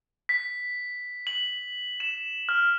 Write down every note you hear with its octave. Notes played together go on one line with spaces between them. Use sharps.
B6
F#7
E7
F6